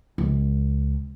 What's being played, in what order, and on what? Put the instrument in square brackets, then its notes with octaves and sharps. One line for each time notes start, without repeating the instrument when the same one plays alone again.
[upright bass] C#2